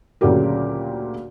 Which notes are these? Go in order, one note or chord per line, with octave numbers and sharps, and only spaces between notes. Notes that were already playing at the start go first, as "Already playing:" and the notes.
D2 A#2 C#3 F#3 G4 A#4